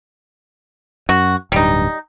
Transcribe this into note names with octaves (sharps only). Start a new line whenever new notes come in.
F#2 F#4
D1 G2 G3 D#4